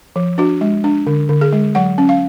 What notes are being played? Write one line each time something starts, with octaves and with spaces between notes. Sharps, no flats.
F3
D4 F#4
G#3
D4
D3
D3
G#4
G#3
F#3 F#5
C#4
F5